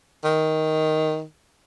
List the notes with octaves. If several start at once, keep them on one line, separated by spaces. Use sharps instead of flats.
D#3